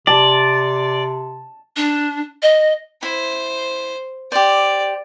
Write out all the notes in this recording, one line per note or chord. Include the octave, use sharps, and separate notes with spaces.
C3 D5 A5
D4
D#5
E4 C5
G4 C5 D5